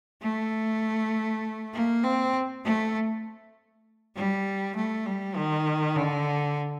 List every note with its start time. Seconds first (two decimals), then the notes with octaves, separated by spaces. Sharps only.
0.22 A3
1.73 A#3
2.04 C4
2.65 A3
4.15 G3
4.76 A3
5.06 G3
5.36 D#3
5.96 D3